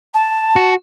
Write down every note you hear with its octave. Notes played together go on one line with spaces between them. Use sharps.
A5
F#4